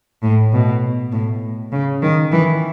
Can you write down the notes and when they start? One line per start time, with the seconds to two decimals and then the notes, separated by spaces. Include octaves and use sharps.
0.23 A2
0.52 B2
1.12 A2
1.72 C#3
2.02 D#3
2.32 E3